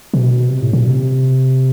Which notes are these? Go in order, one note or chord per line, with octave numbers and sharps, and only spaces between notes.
B2
C3
A2
A#2
C3